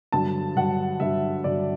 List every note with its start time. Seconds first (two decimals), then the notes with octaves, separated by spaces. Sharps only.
0.12 G2 D3 F#3 A5
0.56 G2 D3 F#3 F#5
1.00 G2 D3 F#3 E5
1.44 G2 D3 F#3 D5